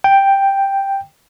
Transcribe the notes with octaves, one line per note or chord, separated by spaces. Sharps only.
G5